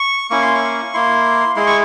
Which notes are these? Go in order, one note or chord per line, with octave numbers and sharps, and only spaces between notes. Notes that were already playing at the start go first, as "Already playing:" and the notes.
Already playing: C#6
A#3 C#4 E4 C#6
C6
C#6
A#3 E4 C6
G#3 E4 C6
C#6